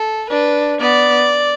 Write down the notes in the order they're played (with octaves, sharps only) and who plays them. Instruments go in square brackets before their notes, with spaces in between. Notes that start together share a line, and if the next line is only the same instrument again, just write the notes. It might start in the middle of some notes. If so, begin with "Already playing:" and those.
Already playing: [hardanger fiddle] A4
[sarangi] D4 [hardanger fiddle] B4
[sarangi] B3 [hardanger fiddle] D5